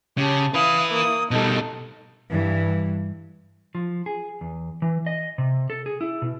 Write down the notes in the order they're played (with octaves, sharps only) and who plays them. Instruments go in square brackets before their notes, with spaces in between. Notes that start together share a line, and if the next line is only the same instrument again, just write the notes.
[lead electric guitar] C#3 [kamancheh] G4 A5
[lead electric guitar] E4 B4 [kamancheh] F5 D#6
[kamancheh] A#3 D#6
[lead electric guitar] B2 G3 [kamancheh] D#4 A4
[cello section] G2 E3
[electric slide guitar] F3
G#4
E2
E3
D#5
C3
A4
G#4
E4
B2